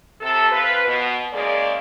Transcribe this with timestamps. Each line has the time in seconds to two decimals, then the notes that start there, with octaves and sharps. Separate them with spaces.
0.21 C3 A4
0.51 C4 F4 B4
0.86 B2
1.32 C#3 G#3 A#3 G#4 D5